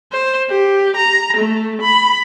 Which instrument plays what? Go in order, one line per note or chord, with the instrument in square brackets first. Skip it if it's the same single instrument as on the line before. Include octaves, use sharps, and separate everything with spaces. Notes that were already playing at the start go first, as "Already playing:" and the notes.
[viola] C5
G4
A#5
A3
B5